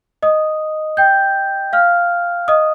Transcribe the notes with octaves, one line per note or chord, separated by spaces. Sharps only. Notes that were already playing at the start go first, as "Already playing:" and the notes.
D#5 D#6
G5 G6
F5 F6
D#5 D#6